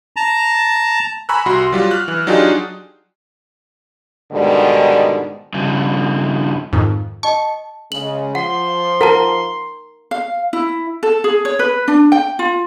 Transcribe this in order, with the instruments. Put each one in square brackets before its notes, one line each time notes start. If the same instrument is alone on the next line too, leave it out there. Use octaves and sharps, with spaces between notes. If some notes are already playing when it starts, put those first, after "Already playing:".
[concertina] A5 A#5
[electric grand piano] G#5 A#5 B5 C#6 E6 F#6
C2 F#4 C6
F#3 G3 F4
F6 F#6
E3
F#3 D4 D#4 F4 G4 G#4
[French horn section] G#2 B2 D3 D#3 G3 G#3
[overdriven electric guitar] G2 C#3
[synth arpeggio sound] F2 G#2 D#3
[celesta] D#5 A5 [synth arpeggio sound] C#6
[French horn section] C#3 G#3 [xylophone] F#7
[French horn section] F3 [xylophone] F#5 [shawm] C6
[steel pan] A#4 [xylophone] F#5 A5 A#5
[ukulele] F5
E4
A4
G#4
C#5
B4
D4
G5
F4